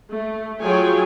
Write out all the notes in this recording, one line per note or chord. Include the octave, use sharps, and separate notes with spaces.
A3
F#3 F4 G#4 C#5 G5 G#5